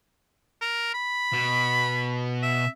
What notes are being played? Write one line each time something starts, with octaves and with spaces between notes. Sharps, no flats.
A#4
B5
B2
E5